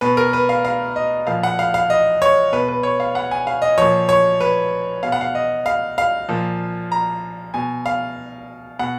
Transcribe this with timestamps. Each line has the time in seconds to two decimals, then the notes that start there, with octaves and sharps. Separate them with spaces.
0.01 B2 B4
0.17 A#4
0.33 B4
0.49 F5
0.65 F5
0.96 D#5
1.27 A#2 F3 F5
1.43 F#5
1.59 F5
1.74 F5
1.90 D#5
2.22 C#5
2.53 B2 B4
2.68 B4
2.83 C#5
3.00 F5
3.15 F#5
3.31 G#5
3.47 F5
3.62 D#5
3.78 A#2 F3 C#5
4.09 C#5
4.41 B4
5.03 B2 F5
5.12 F#5
5.21 F5
5.35 D#5
5.66 F5
5.98 F5
6.29 A#2 F3
6.92 A#5
7.54 B2 G#5
7.86 F5
8.79 B2 F#5